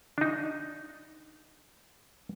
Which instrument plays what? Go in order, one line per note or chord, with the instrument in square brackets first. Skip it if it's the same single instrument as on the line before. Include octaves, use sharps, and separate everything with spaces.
[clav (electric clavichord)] D4 D#4